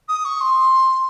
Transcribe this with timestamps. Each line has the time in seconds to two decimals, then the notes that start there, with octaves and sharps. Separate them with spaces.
0.08 D#6
0.24 C#6
0.40 C6